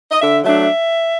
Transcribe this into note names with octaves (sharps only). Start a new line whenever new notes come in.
D#5
D3 E5
F#3 A3 D4 E5